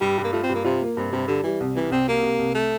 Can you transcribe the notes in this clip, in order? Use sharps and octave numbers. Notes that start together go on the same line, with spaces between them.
G2 G3
G2
A#3
A3 F4
C4
G2
A#3
C3 F4
A#3
G2 C3
G2 C3
D3 G3
E3 G3
C2
C3 E3
C2 C4
C3 A#3
C3
C2
A3